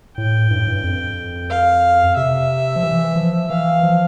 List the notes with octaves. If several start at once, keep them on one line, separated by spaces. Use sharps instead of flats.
A2 G5
G2
A2
G2
F2
F5
C3 E5
F3
E3
F3
E3 F5
F3